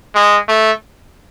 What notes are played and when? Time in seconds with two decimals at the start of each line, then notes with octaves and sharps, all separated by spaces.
0.15 G#3
0.48 A3